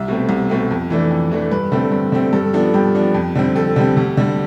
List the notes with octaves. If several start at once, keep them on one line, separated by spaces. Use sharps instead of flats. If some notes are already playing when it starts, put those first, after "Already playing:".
Already playing: C2 E5
B2 A3 C4
C2
B2 A3 C4
F2
E3 A3 D4
F2
E3 A3 D4
G2 B4
D3 A3 C4
G2
D3 A3 C4
G2 A4
F3 B3 D4 A4
G2 G4
F3 B3 D4
F2
D3 G3 C4
F2 A4
D3 G3 C4 G4
D2
D3 G3